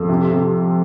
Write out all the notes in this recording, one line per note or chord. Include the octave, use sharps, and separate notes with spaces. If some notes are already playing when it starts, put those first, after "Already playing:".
Already playing: F2
C3
C3